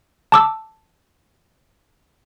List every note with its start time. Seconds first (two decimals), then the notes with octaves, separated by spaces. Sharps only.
0.32 A5 D6 E6